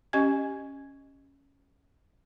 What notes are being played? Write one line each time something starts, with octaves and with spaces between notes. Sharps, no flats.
C#4 G4 D#5 G#5 G#6